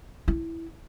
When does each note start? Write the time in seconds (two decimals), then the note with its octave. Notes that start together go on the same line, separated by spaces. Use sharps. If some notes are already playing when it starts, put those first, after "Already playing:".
0.28 E4